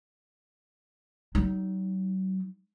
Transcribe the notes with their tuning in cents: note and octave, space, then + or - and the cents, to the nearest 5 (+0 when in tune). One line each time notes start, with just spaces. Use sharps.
F#3 +40 D#4 +0